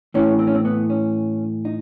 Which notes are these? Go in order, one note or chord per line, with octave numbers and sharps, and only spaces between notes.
A2 E3 C#4
C4
C#4
C4
B3
C#4
D#4